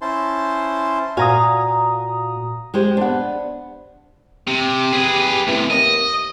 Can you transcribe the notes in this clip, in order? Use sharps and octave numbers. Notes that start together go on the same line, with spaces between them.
C#4 E4 C5 A5 C6
A#2 F#4 F5 G#5 A#5 D#6
G#3 G4 C5
B3 D4 C5 F#5
C3 G4
G#4 B4
A2 C3 E3
D#2 D#5